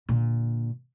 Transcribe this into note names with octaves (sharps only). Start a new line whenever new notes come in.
A#2 D3